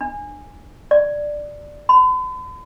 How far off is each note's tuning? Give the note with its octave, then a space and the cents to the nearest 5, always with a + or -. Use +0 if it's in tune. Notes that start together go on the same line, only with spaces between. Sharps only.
D4 +15
D5 +5
B5 +45